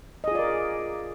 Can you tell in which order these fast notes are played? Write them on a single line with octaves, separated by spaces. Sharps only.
D#5 G#4 F4 D5 A#4